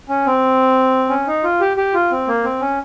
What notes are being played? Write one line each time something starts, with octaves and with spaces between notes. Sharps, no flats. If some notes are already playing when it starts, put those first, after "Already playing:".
C#4
C4
C#4
D#4
F4
G4
G4
F4
C4
A#3
C4
C#4